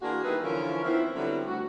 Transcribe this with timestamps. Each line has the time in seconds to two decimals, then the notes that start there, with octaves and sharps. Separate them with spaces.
0.02 E3 A#3 D4 F4 F#4 G#4
0.24 D#3 G3 B3 E4 G#4 B4
0.42 D3 E3 F3 C#4 F4 A#4
0.84 D#3 F3 B3 C4 E4
1.13 D3 F#3 G3 B3 C4 E4
1.47 D2 F#4